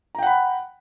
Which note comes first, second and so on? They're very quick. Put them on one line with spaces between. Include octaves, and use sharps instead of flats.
A#5 G5 F#5 B5